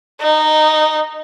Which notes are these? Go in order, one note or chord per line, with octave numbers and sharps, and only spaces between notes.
D#4